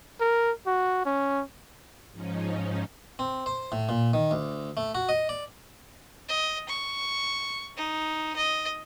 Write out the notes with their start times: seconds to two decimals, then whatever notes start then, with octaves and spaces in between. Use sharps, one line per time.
0.21 A#4
0.67 F#4
1.06 C#4
2.11 G#2 F3 C#4 D#4
3.19 C4
3.46 C5
3.72 A2
3.89 A#2
4.14 D#3
4.31 D2
4.77 A3
4.95 F#4
5.09 D#5
5.29 D5
6.29 D#5
6.69 C#6
7.77 D#4
8.37 D#5